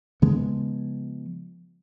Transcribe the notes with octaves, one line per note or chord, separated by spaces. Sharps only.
C#3 F3 G#3 B3